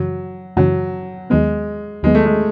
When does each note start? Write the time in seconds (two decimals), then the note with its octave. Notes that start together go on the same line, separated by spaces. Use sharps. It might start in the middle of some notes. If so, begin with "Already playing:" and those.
Already playing: F#2 C#3 E3 F#3
0.57 F#2 C#3 E3 F#3
1.30 D#2 D#3 F#3 G#3 B3
2.03 D#2 D#3 F#3 G#3 B3
2.15 A3
2.25 G#3